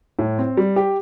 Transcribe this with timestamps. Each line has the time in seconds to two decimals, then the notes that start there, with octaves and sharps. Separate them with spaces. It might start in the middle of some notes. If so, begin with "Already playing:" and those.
0.19 A2
0.38 C4
0.57 G3
0.76 G4